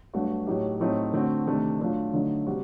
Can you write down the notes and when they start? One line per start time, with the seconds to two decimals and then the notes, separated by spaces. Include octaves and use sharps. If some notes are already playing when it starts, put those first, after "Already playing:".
0.14 G2 F#3 A3 D4 F#4
0.47 A2 F#3 A3 D#4 G4
0.80 A2 F#3 A3 C4 D#4
1.13 D3 A3 C4 F#4
1.46 C3 D#3 A3 D4
1.80 A#2 F#3 A3 D4
2.13 D3 F#3 A3 D#4
2.47 C3 G3 C4 F#4